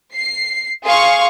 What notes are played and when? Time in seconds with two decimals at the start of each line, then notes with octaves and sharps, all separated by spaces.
0.14 C7
0.83 G#4 F5 C6 C#6